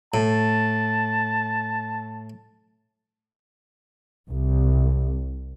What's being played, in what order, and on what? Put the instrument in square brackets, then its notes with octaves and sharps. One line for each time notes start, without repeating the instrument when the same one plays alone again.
[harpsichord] A2 [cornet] A5
[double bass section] C2